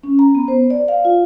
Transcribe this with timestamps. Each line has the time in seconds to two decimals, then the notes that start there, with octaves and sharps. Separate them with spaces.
0.03 C#4
0.19 A#5
0.35 B3
0.48 C5
0.70 D5
0.88 F5
1.05 F4